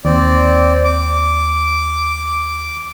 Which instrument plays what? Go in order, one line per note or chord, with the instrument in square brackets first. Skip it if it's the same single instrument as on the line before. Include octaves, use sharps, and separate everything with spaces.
[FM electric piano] D#2 [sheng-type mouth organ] C4 D5
[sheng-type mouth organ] D6